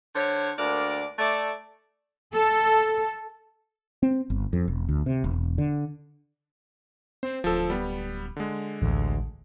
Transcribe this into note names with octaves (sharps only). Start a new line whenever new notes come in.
D3 C5 C#5
D2 A#3 D4 A#4 D5
A3 D5
A4
C4
G1
F2
E1
D2
C3
E1
D3
C4 C5
D1 F3 A4
G3 B3
D3 G#3
A1 D2